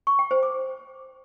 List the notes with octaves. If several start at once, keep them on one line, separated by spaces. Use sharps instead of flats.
C#6
G5
C5
D6